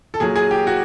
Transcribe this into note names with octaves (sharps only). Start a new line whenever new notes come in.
A4
A#2 F#3 G#4
G#4
G4
F#4